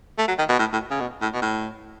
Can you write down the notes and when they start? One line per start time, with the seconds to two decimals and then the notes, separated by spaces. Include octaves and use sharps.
0.18 A3
0.28 F#3
0.38 D#3
0.49 B2
0.59 A2
0.73 A2
0.91 C#3
1.00 B2
1.21 A2
1.33 B2
1.42 A2